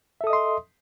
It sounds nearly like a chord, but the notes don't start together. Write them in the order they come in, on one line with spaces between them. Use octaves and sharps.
E5 A4 D#6 D#5 C6